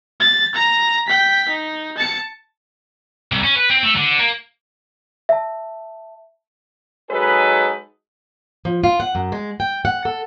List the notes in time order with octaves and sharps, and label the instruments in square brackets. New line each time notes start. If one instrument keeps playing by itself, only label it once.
[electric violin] A6
A#5
G5 B6
D#4
A5 C#7
[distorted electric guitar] C2
C#4
B4
C4
A3
D3
A#3
[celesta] E5 A5
[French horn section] F#3 G#3 D#4 G#4 A4 B4
[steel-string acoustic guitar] F3
F4
F#5
F#2
G#3
G5
F#5
A4